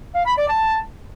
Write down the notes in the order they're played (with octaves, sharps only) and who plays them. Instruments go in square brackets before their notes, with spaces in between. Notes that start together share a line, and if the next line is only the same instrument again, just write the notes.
[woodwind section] F5
B5
D5
A5